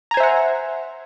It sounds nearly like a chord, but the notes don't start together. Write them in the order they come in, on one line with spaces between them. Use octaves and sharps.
A#5 G#5 C5 E5 F#5